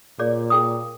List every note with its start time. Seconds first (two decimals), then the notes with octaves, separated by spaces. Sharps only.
0.19 A#2 G#4 C#5 D5
0.50 G#4 G5 D#6